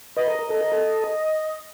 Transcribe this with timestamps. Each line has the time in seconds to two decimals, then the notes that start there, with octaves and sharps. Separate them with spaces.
0.16 B4 D#5
0.28 A#4
0.39 A#4
0.50 A4
0.61 A#4
0.72 A4